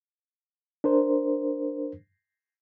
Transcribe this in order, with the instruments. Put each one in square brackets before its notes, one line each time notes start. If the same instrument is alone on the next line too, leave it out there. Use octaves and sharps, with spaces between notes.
[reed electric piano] D4 A#4 C5